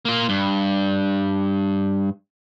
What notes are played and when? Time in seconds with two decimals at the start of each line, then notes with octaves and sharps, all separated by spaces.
0.05 A#3 F4
0.29 G2